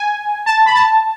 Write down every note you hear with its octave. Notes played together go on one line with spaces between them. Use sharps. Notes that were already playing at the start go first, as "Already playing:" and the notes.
Already playing: G#5
A5
B5
A5